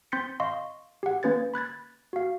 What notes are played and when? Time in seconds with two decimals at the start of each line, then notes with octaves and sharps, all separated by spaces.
0.12 C4 C6 G6 A6 B6 C#7
0.40 D#5 F5 C6 C#6
1.03 G4 F#5
1.23 A#3 C#4 B4 G#6 A6
1.54 B5 F#6 G#6 A6
2.13 F#4 F5